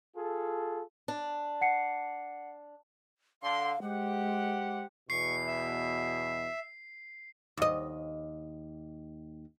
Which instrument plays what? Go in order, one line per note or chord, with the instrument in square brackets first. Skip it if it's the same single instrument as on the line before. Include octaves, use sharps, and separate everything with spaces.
[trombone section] F4 G#4 A4
[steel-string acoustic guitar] D4
[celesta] F#5 C7 C#7
[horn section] D3 C6 [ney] F5
[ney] G#3 [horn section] G4 C5 F#5
[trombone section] E2 B2 [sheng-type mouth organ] C#6 [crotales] C7
[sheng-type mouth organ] E5
[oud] D#2 D#5